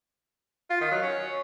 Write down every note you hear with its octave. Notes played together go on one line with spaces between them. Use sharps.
F4
D#3
F#3
C#4